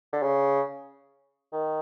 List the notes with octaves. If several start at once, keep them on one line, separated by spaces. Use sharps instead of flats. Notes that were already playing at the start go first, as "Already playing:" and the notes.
D3
C#3
D#3